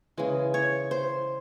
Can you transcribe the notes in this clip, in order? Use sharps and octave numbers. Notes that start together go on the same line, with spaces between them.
C#3 E3 G#3
C#5
C5